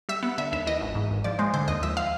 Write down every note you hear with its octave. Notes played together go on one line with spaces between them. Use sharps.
G3 E5
B3
D3 E5
D#2 E5
E3 D#5
G#1
G#2
G#1
F3 D5
G#3 C5
D3 C5
D#2 D#5
F3 E5
F5